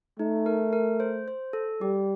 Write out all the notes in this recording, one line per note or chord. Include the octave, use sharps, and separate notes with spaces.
A3 D#4
A#4
A#4
C5
C5
A4
G3 G4